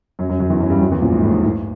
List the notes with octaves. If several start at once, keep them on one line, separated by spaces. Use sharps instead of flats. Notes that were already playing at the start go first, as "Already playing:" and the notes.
F#2 F#3
F#2 F#3
F#2 F#3
E2 E3
F#2 F#3
G2 G3
F#2 F#3
E2 E3
A#1 A#2
G#2
A2
G#2
A2